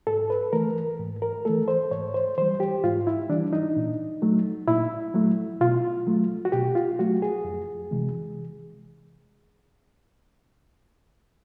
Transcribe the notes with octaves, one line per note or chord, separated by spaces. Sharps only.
G#2 A4
B4
E3 A3 A#4
G#2
A#4
E3 A3 A4
C5
G#2 C#5
C5
E3 G3 C5
G4
G#2 F4
E4
E3 G3 D4
D#4
A#2
F#3 A3
A#2 E4
F#3 A3
B2 F4
F#3 A3
F#4
B2 G4
F4
F#3 A3 F#4
G#4
F2
C3 E3 G#3